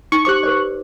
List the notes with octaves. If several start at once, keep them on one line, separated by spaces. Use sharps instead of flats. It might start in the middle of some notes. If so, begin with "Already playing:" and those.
D#4 C#6
G4 C5 C#6 D6 F#6
B4 C5 D5